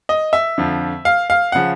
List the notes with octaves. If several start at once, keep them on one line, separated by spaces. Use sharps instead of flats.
D#5
E5
F2 D3 F3
F5
F5
C#3 F3 F#5